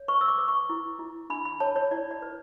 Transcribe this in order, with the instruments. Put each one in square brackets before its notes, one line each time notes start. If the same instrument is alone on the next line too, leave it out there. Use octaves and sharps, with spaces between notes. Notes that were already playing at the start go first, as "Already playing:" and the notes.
Already playing: [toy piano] C#5
B4 C#6
E6
D6
B4
C#6
E4
E4
D4 B5
B5
C#5 A5
C#5
E4 D5
D5
B4